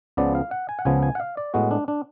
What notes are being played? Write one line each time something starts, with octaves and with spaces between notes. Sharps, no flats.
C#2 C#3 F3 B3 D5
F5
F#5
G#5
F#5
C#2 C#3 F3 B3 G#5
G#5
F#5
F5
D5
A2 G#3 B3 F#4
D4
D4